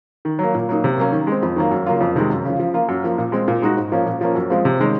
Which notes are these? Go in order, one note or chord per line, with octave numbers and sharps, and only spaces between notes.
D#3
F#3 A#3
A#2
F#3 A#3 D#4
C3
F#3 A#3 C#4
D#3
G#3 C4
F2
D#3 F#3 A#3
F#2
C#3 F#3 A#3 F4
F2
C3 D#3 G#3
F#2
C#3 F3
F3
A#3 F4
F#2
F3 A#3 F4
A#2
G#3 C4
A#2
G#3 D#4 F#4
G#2
F3 A#3 C#4
A#2
F3 A#3 C#4
F#2
F3 G#3 C4 F4
C3
D#3 G#3 C#4